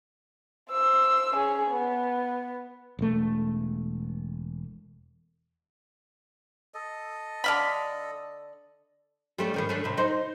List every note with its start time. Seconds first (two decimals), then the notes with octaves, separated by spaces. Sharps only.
0.71 C5 E6
1.34 C#4 G#4
1.71 B3
2.99 E1 A3
6.74 A4 D#5
7.44 D3 F5 B5
9.39 G3 A3 C#4
9.54 A2 D#3 C#4
9.69 A3 C#4 D4
9.84 A2 C3
9.97 D#4 C5